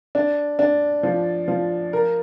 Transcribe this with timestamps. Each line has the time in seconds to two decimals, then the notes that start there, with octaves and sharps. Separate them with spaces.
0.15 D4
0.59 D4
1.03 F3
1.48 F3
1.93 A#4